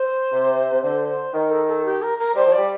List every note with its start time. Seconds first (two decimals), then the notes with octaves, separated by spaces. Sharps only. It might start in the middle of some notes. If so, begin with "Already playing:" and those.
Already playing: C5
0.32 C3
0.72 C3
0.82 D3 C5
1.08 C5
1.33 D#3 A#4
1.50 A4
1.67 A4
1.85 G4
2.02 A#4
2.18 A#4
2.35 G3 C5
2.46 F3
2.52 G3 D5